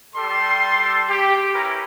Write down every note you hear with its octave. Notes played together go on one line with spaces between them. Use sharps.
G3 A4 C6
G4
C#4 E4 G4 A#4 B4 A#5